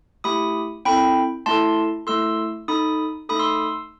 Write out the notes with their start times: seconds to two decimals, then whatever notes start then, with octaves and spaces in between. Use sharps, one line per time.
0.24 A3 E4 G4 B5 D#6
0.85 C4 E4 A4 G5 B5
1.46 A3 E4 A4 A5 C6
2.07 A3 E4 A4 C6 E6
2.68 D#4 A4 B5 D#6
3.29 A3 D#4 A4 B5 D#6
3.39 C6 E6